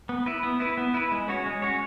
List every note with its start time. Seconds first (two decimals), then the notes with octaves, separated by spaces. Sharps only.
0.09 B3
0.26 E4 B4
0.43 B3
0.60 E4 B4
0.78 B3
0.94 E4 B4
1.12 G#3
1.28 C#4 F#4 C#5
1.46 G#3
1.62 C#4 F#4 C#5